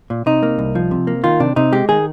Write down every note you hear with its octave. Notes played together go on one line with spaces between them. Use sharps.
A#2
C3 D#4
A#3
C2
F3
C3
A#3
D#3 F4
C3 D4
C3 D#4
G#3 G4
D#3 G#4